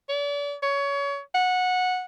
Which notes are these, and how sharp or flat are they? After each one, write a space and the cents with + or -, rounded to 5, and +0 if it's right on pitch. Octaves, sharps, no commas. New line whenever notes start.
D5 -40
C#5 +25
F#5 -15